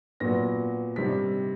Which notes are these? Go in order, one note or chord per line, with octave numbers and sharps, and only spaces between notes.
A#2 F#3 B3 A#6
C3 D#3 G3 B6